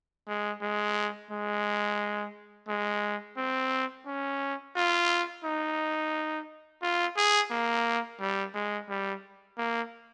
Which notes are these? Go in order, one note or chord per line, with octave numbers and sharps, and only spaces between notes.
G#3
G#3
G#3
G#3
C4
C#4
F4
D#4
F4
G#4
A#3
G3
G#3
G3
A#3